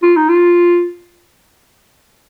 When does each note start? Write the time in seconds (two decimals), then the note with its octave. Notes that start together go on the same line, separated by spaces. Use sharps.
0.03 F4
0.16 D#4
0.29 F4